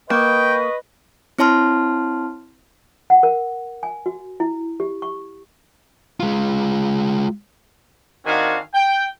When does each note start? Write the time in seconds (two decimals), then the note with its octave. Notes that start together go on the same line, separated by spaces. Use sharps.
0.10 A#3 B4 D#5 G5 C#6
1.39 C4 E4 C#5 A5 C6 F6
3.10 F#5
3.23 A#4
3.83 G#5
4.06 F#4
4.40 E4
4.80 G4
5.02 C#6
6.20 G#3 F4
8.25 D#3 C4 D4 F#4 F5 G#5
8.74 G5